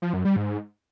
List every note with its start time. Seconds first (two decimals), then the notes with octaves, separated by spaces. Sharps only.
0.02 F3
0.13 F#2
0.25 G3
0.36 G#2